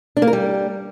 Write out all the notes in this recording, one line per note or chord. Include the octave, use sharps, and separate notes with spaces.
D4
A#3
A#4
G3